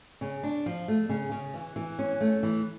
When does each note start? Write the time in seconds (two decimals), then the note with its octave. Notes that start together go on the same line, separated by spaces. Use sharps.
0.21 C#3
0.43 D4
0.66 F3
0.88 A3
1.09 C#3
1.32 C#3
1.54 E3
1.76 E3
1.99 C#4
2.21 A3
2.43 E3